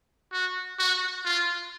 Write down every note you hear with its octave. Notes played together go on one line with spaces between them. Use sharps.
F#4
F#4
F4